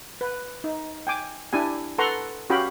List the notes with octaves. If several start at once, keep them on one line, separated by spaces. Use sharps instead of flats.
B4
D#4
G5 G#5 D6
D4 E4 G4 G#5
A4 B4 F#5 A#5 C6 C#6
C#4 F#4 G4 F5 G5 B5